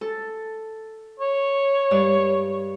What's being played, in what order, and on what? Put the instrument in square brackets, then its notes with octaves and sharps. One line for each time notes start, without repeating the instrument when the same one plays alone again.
[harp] A4
[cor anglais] C#5
[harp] G2 D5